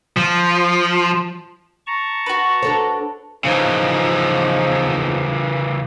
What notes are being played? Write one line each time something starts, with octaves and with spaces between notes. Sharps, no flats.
F3
A5 A#5 C#6
F#4 B4
D4 A4 C#5
C#3 E3 F3 D#4